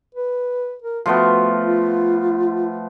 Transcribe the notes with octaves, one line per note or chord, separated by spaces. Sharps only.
B4
A#4
F3 A3 B3 F#4
F4